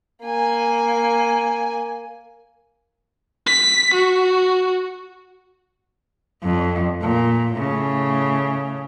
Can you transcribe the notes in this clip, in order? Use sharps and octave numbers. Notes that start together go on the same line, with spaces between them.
A#3 G#5
B6
F#4
F2
A#2
A2 C#3